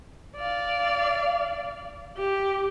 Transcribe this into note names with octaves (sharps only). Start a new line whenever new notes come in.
D5 F5
G4